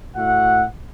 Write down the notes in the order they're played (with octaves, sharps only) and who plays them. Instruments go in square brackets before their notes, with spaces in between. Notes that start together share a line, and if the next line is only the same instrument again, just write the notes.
[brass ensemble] A2 F#4 E5 F#5